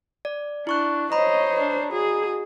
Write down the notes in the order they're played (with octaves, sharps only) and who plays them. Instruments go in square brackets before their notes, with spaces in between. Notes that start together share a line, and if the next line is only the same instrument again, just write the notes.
[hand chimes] D5
[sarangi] D4 [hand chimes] E4 C#6 F#6
[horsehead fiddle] C5 C#5 [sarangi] D#5 [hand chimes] A#5 B5
[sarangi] D4
[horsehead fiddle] F#4 [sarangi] G#4